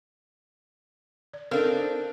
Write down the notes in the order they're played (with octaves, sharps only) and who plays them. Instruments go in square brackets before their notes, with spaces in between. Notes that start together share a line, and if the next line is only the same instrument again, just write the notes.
[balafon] D5
[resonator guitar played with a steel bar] C4 D4 D#4 [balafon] A4 A#4 F5